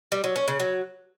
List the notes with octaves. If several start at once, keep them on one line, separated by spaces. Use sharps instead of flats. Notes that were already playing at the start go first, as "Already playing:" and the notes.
G3
F#3
C#4
C#3
F#3